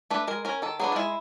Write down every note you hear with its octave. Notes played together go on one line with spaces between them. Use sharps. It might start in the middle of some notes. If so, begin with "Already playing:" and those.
A3 D4 B4
G#3 A#4
C#4 A#4
D#3 A4
F#3 B3 D4 G#4
F4
G#3 E4